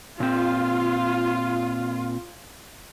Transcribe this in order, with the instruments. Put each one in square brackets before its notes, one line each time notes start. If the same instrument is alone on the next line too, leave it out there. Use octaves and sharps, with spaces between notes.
[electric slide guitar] A#2 C4 [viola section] F4